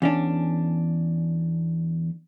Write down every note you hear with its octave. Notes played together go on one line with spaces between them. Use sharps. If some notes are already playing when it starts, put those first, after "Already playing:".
E2 C#4 D4